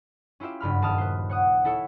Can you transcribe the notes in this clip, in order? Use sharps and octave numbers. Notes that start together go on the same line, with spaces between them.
C#4 E4 F4 G4 E5
F#1 G2 B5 F6
D#1 A#3 A5 D#6 F6
B4 C5
C#5 F#5 D#6
E4 A4 C#5 E5